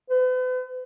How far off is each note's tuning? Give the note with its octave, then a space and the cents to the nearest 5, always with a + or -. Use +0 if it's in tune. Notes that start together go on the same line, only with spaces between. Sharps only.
B4 +45